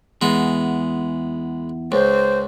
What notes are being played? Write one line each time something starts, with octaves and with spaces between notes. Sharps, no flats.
E2 G#3 B3
C#2 C5